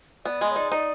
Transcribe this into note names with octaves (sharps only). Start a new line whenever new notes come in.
B3 D5
G#3 D#5
C#5
D#4 D5
D#4 D5